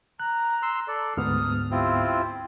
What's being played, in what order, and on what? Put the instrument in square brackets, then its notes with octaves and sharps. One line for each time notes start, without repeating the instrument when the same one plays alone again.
[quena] A#5 [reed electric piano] F#6
[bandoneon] C6 E6
A4 D5
[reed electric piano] D2 G#2 B3 [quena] D#6 [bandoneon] F6
[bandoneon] C4 E4 F4 [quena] G4